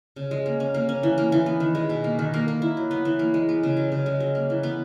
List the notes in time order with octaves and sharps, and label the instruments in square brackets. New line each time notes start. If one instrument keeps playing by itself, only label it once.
[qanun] C#3
G#3
A#3
C#4
A#3
C#4
E3
A#3
E3
B3
D#3
G#3
B2
A#3
D#3
A#3
A#3
E4
F#3
B3
E3
A#3
G#3
B3
C#3
F#3
C#3
G#3
F#3
A#3
E3
B3